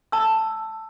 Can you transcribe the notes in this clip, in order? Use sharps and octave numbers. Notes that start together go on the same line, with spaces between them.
A5 E6